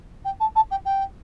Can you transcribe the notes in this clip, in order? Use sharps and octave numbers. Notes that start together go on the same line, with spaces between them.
G5
A5
A5
G5
G5